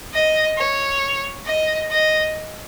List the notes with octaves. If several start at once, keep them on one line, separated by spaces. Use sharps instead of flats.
D#5
C#5
D#5
D#5